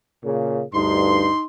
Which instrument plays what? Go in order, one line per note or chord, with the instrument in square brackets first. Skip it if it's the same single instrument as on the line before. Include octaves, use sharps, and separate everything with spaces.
[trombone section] A#2 C#3
[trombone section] D2 G2 [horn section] D#4 C6